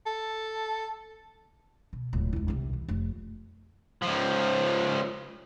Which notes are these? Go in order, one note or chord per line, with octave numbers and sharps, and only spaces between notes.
A4
B2
D1 C#2
E1 E4
C2 C3
E3
F1
C#2 F3